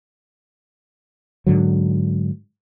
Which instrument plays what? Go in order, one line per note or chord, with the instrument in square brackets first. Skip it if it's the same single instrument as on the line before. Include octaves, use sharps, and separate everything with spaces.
[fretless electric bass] G#2 D3 F#3